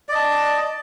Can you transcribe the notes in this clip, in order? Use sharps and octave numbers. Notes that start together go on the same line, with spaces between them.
D5 D#5 A5